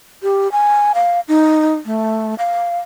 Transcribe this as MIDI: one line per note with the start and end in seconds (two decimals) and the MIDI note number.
0.23 0.50 67
0.52 0.92 80
0.94 1.20 77
1.28 1.75 63
1.86 2.35 57
2.39 2.78 77